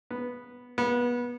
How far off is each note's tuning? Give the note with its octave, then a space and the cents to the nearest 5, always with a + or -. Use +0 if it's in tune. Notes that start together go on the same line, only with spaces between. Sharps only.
B3 -5
B3 -25